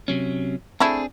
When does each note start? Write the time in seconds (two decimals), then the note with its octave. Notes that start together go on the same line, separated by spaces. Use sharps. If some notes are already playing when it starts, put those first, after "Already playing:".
0.08 C3 F#3 C#4
0.80 A3 C4 D4 E4 G#4